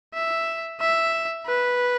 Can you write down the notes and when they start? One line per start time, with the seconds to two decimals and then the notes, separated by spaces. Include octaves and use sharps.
0.14 E5
0.80 E5
1.46 B4